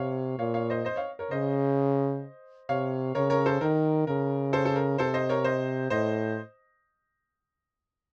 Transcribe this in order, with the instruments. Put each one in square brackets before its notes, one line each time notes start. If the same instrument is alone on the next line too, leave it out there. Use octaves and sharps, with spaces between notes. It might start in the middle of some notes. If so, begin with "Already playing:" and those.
Already playing: [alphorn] C3 [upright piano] C#5 F5
[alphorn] A#2 [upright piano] C#5 F5
[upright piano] C#5 F5
C5 D#5
C5 D#5
C#5 F5
A#4 C#5
[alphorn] C#3 [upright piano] C5 D#5
[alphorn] C3 [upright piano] C#5 F5
[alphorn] C#3 [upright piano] A#4 C#5
[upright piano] A#4 C#5
A4 C5
[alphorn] D#3 [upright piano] A#4
[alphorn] C#3 [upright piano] A#4
[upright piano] A4 C5
A4
A#4
[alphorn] C3 [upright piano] A4 C5
[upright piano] C5 D#5
A#4 C#5
C5 D#5
[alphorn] A2 [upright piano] C5 D#5